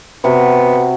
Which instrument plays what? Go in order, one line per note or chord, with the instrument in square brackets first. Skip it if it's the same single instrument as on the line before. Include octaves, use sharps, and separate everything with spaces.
[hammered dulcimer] C3 F#4 [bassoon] B3